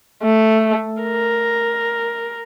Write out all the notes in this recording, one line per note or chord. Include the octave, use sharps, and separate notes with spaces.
A3
A#4